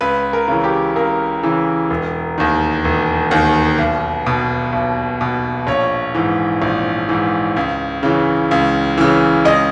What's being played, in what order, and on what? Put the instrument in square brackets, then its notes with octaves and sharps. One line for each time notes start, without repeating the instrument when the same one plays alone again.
[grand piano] C#2 B4
A#4
C#3 E3
G4
C#2 A#4
C#3 E3
E1
D#2 D#3
E1
D#2 D#3
B1
B2
B1
B2
A#1 C#5
G#2 E3
A#1
G#2 E3
C#2
C#3 E3
C#2
C#3 E3
C#2 D#5